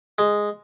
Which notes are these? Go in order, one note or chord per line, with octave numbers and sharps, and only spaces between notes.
G#3